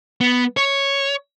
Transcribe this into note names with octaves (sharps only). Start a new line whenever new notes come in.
B3
C#5